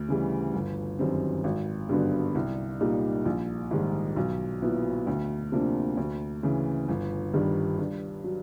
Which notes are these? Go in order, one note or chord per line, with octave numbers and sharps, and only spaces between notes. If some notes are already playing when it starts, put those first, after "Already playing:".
Already playing: D2
C#3 E3 G3
G1
F#2 D#3 G3 C4
G#1
G2 D3 F#3 B3
C2
A#2 G3 A#3 D#4
A#1
G#2 D#3 G3
B1
A#2 F#3 B3 E4
D2
C3 F3 A#3 D4
D2
C#3 E3
G1
G2 D#3 G3
G2
F#3